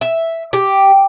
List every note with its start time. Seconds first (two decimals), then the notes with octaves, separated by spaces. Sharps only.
0.01 E5
0.53 G4